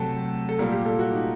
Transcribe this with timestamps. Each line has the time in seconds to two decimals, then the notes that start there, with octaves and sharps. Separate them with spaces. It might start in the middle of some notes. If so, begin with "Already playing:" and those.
Already playing: C3 F#3 A3 A4 F#5 G5 A5
0.49 A4
0.59 A#2 G3 A#3 A#4
0.72 G4
0.85 A4
0.99 F#4
1.12 D#4